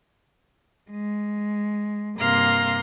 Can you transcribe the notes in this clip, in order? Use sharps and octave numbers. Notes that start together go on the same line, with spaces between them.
G#3
G2 C3 A#3 F5 A#5 C6